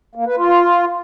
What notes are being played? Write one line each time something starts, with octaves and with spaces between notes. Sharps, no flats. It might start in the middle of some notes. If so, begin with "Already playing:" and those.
A#3
B4
F4